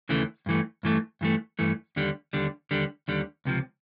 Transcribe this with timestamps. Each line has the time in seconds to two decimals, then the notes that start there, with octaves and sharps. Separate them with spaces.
0.09 D#2 C#3 E3 A3
0.46 G2 E3 A3
0.83 G2 E3 A3
1.21 G2 E3 A3
1.59 G2 E3 A3
1.96 D#2 D3 G3
2.33 D#2 D3 G3
2.71 D#2 D3 G3
3.08 D#2 D3 G3
3.45 C#2 C3 F3